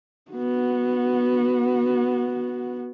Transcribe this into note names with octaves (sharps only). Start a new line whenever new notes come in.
B3 F#4